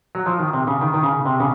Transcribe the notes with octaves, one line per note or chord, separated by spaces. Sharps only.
F#3
F3
D#3
C3
C#3
D#3
D#3
C#3
C3
C#3